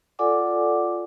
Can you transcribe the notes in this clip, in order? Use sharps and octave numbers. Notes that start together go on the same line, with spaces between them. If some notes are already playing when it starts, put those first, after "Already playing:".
F4 A4 D5 F#5 G#5 D6